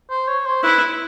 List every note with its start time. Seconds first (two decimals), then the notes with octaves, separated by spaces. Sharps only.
0.10 C5
0.28 C#5
0.45 C5
0.63 E4 B4